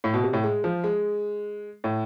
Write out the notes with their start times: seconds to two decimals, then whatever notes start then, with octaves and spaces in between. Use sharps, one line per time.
0.04 A2
0.13 B2
0.24 C3
0.33 A2
0.44 G#3
0.64 F3
0.84 G#3
1.84 A2